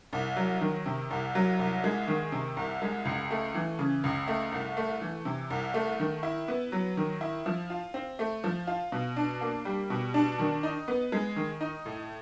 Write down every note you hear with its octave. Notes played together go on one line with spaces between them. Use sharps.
C2
F#3
D#3
C3
C2
F#3
C2
G#3
D#3
C3
C2
G#3
C#2
A3
E3
C#3
C#2
A3
C2
A3
E3
C3
C2
A3
D#3
E4
B3
F#3
D#3
E4
F3
F4
C4
A3
F3
F4
B2
D4
A#3
G3
B2
D4
D#3
D#4
B3
G#3
D#3
D#4
A2